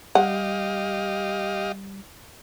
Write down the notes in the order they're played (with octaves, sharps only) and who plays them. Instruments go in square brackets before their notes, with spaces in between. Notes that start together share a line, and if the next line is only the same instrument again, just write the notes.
[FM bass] G3 [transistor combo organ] G4 D#5 F5 [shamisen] F#5